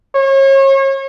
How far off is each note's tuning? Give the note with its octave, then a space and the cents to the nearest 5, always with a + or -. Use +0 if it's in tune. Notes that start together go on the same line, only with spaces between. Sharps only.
C#5 -35